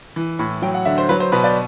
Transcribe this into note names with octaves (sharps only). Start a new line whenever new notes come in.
E3
A2
F#3 G5
F#5
D3 E5
C5
F#3 B4
C5
B2 B4
D5